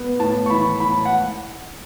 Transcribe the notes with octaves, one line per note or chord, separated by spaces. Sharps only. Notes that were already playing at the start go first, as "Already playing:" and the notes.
Already playing: B3
A2 A5
C#6
E3 B5
A2 B5
F#5